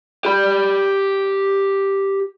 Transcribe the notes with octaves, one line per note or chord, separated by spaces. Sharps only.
G4 B5